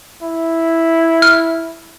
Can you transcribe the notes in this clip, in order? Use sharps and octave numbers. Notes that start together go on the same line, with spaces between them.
E4
F6